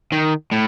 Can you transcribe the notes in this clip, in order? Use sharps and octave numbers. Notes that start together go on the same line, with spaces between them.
D#3
A2